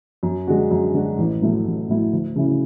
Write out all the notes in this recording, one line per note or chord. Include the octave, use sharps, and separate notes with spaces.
F#2
D3 G#3 D4 F#4
F#2
D3 G#3 D4 F#4
A1
A2 F#3 A3 E4
A1
A2 F#3 A3 E4
D2
C#3 F#3 C#4 E4